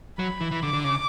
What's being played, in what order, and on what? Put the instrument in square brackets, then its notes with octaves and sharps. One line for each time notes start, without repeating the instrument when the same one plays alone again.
[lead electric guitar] F#3 [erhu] B5
[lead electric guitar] E3
E3
[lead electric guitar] D3 [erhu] D6
[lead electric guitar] D3
C#3